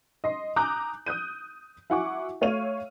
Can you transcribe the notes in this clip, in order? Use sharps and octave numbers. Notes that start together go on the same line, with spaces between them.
D#5 C6
G#5 A#5 D6 D#6 F#6 G6
D#6 F#6 G6 D#7
E4 F#4 F#5 G#5 C#6 D6
A3 C#5 F5 F6 D#7 F7